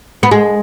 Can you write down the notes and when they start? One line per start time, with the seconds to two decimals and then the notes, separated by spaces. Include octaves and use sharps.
0.23 B3
0.31 G#3